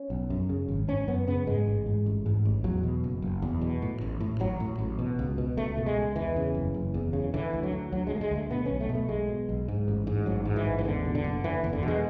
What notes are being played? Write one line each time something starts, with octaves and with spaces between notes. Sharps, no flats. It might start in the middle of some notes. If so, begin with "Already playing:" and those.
Already playing: C#4
B1
F#2
C#3
G#1
G#1 C#4
F#2 B3
C#3 B3
G#2 G#3
A1
G#2
A1
G#2
A1
E2 F#3
B2
F#1
F#1
E2
B2
A2
A1
A2
A1 F#3
A2
A1
B2
C#2
B2
C#2 A3
B2
G#3
C#2
E2 E3
C#3
F#1
F#1
E2
C#3
D3 E3
D2
F#3
D3
D2 F#3
G#3
D3 A3
G#3
D2 A3
B2 B3
B1 C#4
A3
B2
A3
B1 G#3
B2
B1
G#2
A1
G#2
A1 F#3
G#2
E3
A1
E3
E2 D3
B2
D3
F#1
F#1 E3
E2
D3
B2 G#3